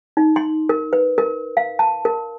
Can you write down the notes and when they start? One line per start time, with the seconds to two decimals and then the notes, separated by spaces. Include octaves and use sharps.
0.17 D#4
0.36 C6
0.69 A#4
0.93 B4
1.18 A#4
1.57 F5
1.79 A5
2.05 A#4